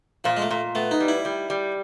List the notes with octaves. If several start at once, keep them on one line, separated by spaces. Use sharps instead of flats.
A#2 F3
G#3
A3
A#2
A3 B3
D#4
G3
E4
G3
G3